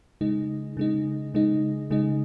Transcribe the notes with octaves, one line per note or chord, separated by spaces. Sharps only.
C#3 G#3 D#4
C#3 G#3 D#4
C#3 G#3 D#4
C#3 G#3 D#4